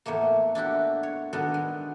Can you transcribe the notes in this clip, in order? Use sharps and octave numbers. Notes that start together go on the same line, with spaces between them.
E2 A2 A3 A#3
D4 E4 F#4 G4
C#5
D#3 B3 D4 F#4 A4
G#3